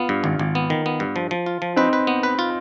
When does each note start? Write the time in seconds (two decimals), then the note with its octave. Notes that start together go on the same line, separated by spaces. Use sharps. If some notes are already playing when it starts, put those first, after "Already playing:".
Already playing: B3 F4
0.09 G2
0.24 G#1
0.39 G#1
0.55 B3
0.70 D#3
0.86 B3
1.00 G2
1.16 F3
1.31 F3
1.46 F4
1.62 F3
1.76 C4 D#4 B4
1.93 B4
2.07 B3
2.23 B4
2.39 F4